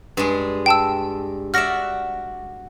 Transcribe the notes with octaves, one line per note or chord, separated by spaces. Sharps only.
G2 G#3
G5 A5 E6
F#4 D5 E5 F6 A#6